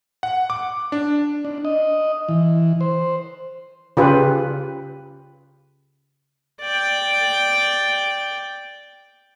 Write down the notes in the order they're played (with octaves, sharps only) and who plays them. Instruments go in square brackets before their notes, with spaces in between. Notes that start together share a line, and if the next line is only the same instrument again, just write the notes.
[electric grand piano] F#5
D6
D4
[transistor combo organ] D4
D#5
E3
C5
[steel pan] C#3 F4 G4 B4
[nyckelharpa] D5 G5